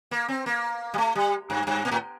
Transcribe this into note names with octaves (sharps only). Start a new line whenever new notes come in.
A#3
C4
A#3
G3
A3
G3
G2
G2
A#2
A2